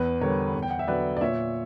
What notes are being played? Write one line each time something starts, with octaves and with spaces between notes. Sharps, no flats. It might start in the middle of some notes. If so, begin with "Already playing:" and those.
Already playing: E2 B4
D3 G3 A#4 C#5
E2
G5
F#5
E5
D3 F#3 B3 B4 D5
D5
A#2 C#5 E5